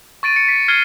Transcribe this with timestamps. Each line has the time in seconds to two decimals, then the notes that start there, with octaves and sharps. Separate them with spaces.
0.23 C#6 A6 D7 D#7
0.36 C#7
0.48 B6
0.68 F6 G#6 C7 D#7 G7